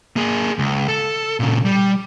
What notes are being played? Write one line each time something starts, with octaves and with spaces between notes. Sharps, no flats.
A#3 G#4
C#2
A4
A#2 C#3
G3